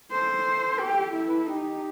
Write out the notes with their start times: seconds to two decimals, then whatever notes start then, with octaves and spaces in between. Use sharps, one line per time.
0.11 A4 C5
0.79 G4
1.13 E4
1.27 B4
1.37 A4
1.46 D#4 G4